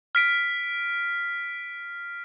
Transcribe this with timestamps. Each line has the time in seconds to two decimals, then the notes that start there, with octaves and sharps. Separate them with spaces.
0.15 F6 B6 D7